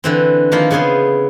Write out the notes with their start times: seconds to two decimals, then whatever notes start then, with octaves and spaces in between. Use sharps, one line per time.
0.04 D3 E3 C4
0.52 D#3 F3 A#3 E4 F4
0.71 C#3 B3 C#4 G#4 C5